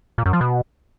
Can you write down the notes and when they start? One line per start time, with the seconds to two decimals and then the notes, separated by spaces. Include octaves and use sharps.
0.18 A#2
0.26 F#2
0.33 F3
0.41 B2